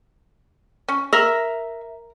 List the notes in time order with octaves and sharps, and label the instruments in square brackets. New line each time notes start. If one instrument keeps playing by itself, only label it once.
[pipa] C#4
[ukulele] A#4 [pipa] E5